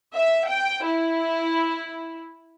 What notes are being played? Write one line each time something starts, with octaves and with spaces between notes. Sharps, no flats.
E5
G5
E4